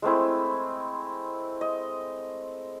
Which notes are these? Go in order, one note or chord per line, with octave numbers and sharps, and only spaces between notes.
G#3 A3 C4 E4
D#5